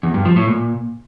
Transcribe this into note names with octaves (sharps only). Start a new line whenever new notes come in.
E2
G2
F3
A2
A#2